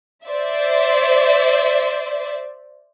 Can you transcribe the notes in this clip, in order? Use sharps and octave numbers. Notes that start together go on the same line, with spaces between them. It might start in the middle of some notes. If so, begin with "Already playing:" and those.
C5 D5 E5